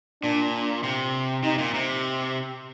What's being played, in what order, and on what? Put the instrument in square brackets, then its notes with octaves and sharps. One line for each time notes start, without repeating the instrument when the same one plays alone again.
[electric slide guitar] A#2 [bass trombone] D4
[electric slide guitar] C3
[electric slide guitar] C3 [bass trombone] D#4
[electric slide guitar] A#2
C3